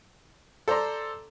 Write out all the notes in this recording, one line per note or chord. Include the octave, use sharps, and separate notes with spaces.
A4 C5 D5 A#5 C6